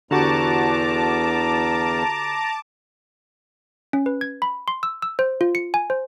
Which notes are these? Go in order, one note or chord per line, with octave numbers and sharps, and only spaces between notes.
E2 D3 F#4 G4 A5 A#5 D6
C#4
B4
G#6
B5
C6
E6
E6
C5
F4
C#7
G#5
C5